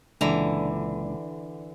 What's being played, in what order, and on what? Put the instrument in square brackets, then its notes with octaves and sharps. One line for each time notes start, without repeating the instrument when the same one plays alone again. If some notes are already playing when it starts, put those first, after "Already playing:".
[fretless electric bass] C#2 A#2 [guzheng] D3 E3 A#5